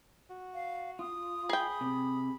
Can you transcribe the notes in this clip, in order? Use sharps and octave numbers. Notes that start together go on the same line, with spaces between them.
F#4
F5
F4 D#6
G#4 G5 B5
C3